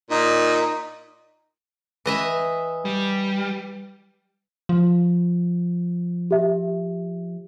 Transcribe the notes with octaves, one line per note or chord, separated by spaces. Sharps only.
A#2 D#4
E3 D#5 E5
G3
F3
G4 E5